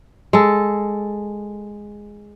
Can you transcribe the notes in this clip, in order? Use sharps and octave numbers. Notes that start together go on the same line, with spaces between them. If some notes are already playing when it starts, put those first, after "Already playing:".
G#3 A4